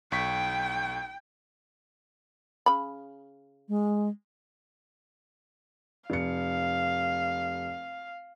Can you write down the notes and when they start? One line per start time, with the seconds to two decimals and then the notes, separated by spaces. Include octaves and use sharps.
0.12 B1 G5 C#6 B6
2.66 C#3 B5
3.69 G#3
6.10 F1 F5 C#7